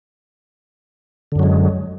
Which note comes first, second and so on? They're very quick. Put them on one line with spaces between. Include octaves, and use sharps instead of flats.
D3 F#2 F#3 G#3